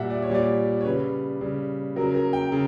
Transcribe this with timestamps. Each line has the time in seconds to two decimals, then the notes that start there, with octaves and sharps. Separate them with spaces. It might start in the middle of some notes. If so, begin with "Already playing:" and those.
Already playing: A#2 G3 E5 F#5
0.10 D5
0.22 C#5
0.30 A#2 G3 D5
0.81 C#5
0.85 C#3 G3 B4
1.41 C#3 G3
1.96 C#3 F#3 A#4
2.14 A#4
2.33 G5
2.52 C#3